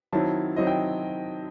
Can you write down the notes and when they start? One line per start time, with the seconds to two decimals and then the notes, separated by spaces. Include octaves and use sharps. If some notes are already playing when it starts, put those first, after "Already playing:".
0.12 D#3 F#3 C4 E4 A5
0.56 D#3 F#3 C4 E4 D#5
0.67 G5